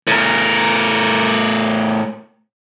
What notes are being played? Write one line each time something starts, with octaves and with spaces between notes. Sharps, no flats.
A2 A#4